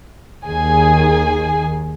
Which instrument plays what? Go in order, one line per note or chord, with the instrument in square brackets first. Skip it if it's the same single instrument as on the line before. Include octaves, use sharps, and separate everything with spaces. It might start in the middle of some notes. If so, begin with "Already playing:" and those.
[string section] D#2 D#3 G#4 G#5